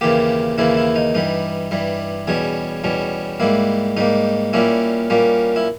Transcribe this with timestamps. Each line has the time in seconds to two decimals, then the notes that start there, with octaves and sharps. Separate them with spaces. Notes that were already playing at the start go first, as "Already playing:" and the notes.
0.01 D#2 C#3 E3 A#3 G4
0.58 D#2 C#3 E3 A#3 E4
0.77 E4
0.96 D#4
1.14 G2 E3 G3 D#4
1.71 G2 E3 G3
2.27 E2 B2 G3 C#4 G#4
2.84 E2 B2 G3 C#4
3.40 G#2 G3 A#3 E4
3.97 G#2 G3 A#3 D#4
4.53 A#2 G3 A#3 C#4 E4
5.10 A#2 G3 A#3 C#4
5.56 E4